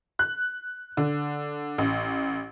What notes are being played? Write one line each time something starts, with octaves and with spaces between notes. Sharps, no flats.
F#6
D3
A1